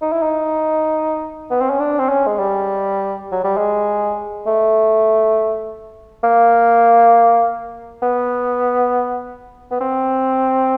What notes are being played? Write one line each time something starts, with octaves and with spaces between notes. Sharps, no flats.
D#4
E4
D#4
B3
C4
C#4
D4
C4
C#4
G#3
G3
F#3
G3
G#3
A3
A#3
B3
B3
C4